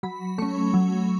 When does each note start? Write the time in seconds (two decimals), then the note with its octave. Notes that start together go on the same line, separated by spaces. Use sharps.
0.03 F#3 B5
0.38 A3 C#4 C#6
0.74 F#3